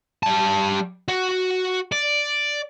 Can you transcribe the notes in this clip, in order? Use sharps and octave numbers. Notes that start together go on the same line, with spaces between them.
G3 A5
F#4
D5